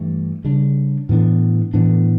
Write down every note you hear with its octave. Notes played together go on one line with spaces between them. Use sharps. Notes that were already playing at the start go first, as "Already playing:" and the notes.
Already playing: G2 E3 A3
C#3 G3 D4
A2 E3 B3 D4
A2 E3 B3 D4